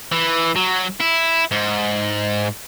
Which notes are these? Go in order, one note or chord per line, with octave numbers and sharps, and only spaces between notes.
E3
F#3
E4
G#2